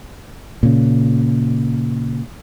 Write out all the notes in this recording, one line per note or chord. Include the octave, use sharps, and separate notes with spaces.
A#2 C#3